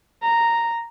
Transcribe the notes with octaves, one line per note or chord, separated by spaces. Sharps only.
A#5